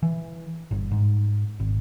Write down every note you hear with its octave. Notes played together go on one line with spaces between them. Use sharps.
E3
G1
G#2
G#1